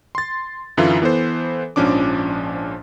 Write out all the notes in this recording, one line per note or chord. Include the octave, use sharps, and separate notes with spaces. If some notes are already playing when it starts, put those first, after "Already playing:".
C6 A6
F#2 D3 E3 E4 F4
E3 B3 A4 C5
A#1 G#2 F3 C#4 D4 D6